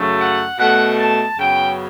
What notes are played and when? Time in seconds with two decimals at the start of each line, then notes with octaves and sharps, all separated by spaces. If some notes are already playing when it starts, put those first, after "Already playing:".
Already playing: F#2 C#3 F#3 A3
0.20 F#5
0.58 B2 A3 F#5
0.98 A5
1.38 F#2 C#3 F#3 B3 G5